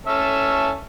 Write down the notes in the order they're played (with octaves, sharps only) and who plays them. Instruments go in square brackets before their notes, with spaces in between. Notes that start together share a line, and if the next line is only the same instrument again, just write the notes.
[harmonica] C#4 A4 E5